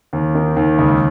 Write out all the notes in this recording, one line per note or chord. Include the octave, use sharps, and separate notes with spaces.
D#2
D#3
D#2
C#2